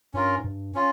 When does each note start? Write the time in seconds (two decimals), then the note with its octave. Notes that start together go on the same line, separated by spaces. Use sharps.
0.14 G2 C#4 F4 A#4
0.39 G#2
0.44 G2
0.75 C#4 F4